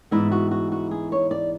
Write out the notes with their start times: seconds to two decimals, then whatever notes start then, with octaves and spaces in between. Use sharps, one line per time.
0.11 G#2 E3 B3 E4
0.32 F#4
0.51 F#4
0.72 F#4
0.91 G#4
1.12 C#5
1.31 D5